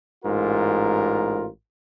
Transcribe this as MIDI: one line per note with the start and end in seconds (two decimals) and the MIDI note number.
0.24 1.46 33
0.24 1.46 44
0.24 1.46 65
0.24 1.46 70